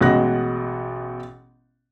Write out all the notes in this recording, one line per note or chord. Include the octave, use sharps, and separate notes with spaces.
A1 B2 G#3 F#4 F#6 A#6